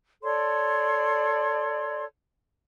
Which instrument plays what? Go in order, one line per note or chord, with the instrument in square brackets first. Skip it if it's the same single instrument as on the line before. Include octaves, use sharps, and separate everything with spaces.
[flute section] A4 C#5 D5 C6